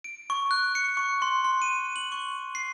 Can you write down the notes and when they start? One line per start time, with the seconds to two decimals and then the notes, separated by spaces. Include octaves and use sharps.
0.04 D7
0.30 C#6
0.51 F#6
0.75 C#7
0.97 C#6
1.22 C6
1.44 C6
1.62 D#7
1.96 F#7
2.12 C#6
2.55 C7